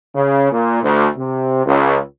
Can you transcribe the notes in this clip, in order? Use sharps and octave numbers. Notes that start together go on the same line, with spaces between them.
C#3
A#2
D2
C3
C#2